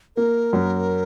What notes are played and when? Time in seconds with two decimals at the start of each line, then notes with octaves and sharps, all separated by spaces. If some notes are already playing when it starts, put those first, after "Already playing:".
0.16 A#3 A#4
0.53 F#2